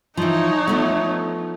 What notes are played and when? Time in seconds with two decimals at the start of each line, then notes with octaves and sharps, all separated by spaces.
0.17 E3 F3 D#4 C#5
0.67 F3 A3 B3